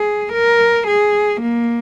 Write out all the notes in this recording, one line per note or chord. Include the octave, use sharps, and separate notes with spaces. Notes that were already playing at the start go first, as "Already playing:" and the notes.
Already playing: G#4
A#4
G#4
A#3